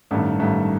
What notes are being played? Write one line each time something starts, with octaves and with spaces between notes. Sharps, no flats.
A1 G2 D#3 A3
A1 G2 D#3 A3